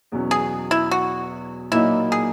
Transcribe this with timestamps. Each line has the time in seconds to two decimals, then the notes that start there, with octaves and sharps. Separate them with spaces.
0.12 E2 B2 F#3 C#4
0.31 G#4
0.71 E4
0.91 F#4
1.71 A#2 F#3 A#3 D#4 E4
2.12 G#4